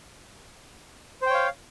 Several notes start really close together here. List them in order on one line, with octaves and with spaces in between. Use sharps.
C5 G5 C#5 F5